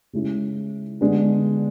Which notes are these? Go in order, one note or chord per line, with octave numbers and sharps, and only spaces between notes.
C#3 G#3 C#4 E4
D3 G#3 B3 D4